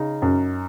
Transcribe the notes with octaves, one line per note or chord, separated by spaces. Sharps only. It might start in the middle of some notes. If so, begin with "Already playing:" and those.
Already playing: C#3 D#4
F#2